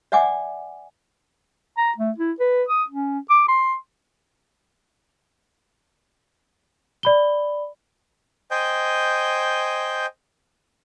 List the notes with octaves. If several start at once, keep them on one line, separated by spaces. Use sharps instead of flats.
D5 E5 F#5 G#5 D6
A#5
A3
E4
B4
D#6
C#4
D6
C6
D5 B5 G7
C5 D#5 G5 G#5 G6